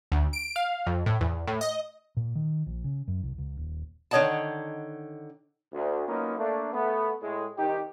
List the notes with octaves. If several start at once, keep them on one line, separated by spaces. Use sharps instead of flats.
D2
D7
F5
F2
A2
E2
A2
D#5
A#2
D#3
A#1
C#3
F#2
C2
C#2
D#1
D3 D#3 C#5 D#5 F#5 A5
D2
F#3 A#3 B3 C#4 D#4 F4
A3 A#3 D4
A3 B3
A2 G#3
C2 D#3 D#4 G4